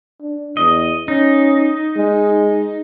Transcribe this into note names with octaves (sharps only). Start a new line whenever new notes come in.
D4
E2 D#5
C#4 D#4
G#3